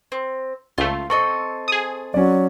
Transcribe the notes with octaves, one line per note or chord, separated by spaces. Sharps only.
C4
C#2 A3 F4
C4 A4 D#5 C#6
G#4 D#6
F#3 C#4 D5